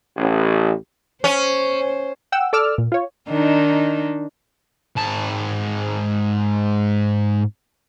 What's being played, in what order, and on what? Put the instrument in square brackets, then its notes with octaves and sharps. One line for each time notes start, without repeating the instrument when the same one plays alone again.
[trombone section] A1
[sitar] C#4 [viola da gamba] C5
[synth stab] F#5 G5 E6
A4 D5 D6 E6 F6
A#2
F4 C#5
[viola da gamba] D#3 D4 D#4
[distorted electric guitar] G#2 A5